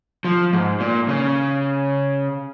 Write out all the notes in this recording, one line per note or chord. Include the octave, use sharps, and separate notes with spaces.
F3
G#2
A#2
C#3